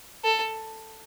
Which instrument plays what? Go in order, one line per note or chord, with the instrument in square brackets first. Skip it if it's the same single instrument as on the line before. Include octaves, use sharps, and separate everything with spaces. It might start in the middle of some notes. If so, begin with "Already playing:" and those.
[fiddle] A4